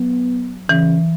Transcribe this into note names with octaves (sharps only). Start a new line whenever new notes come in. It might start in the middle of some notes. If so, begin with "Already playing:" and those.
Already playing: F#3 B3
C#3 E3